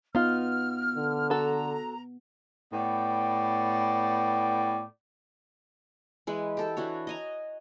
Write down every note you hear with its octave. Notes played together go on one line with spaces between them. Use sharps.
B3 D#4 F4 F6
D3
F#4 A4 A#5
A2 B3 D5 G5
E3 G#3 B4
G4 A4
E3 D4 F#4 C#5
D#5 G#5 A#5